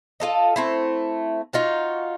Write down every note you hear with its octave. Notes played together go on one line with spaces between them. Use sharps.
F4 A4 D#5
A3 C4 E4
D#4 F4 F#4